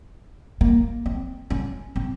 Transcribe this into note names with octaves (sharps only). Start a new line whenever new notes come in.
A#3
C4
C#4
C4